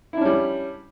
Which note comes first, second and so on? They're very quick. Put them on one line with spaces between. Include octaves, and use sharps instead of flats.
E4 D4 C#4 G3